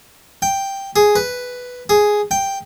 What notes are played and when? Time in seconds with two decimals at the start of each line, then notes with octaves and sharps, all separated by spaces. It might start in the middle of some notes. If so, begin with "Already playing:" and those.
0.42 G5
0.96 G#4
1.16 B4
1.89 G#4
2.31 G5